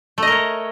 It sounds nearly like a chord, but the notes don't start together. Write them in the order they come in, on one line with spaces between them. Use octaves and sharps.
A3 D#5 A#4 C#5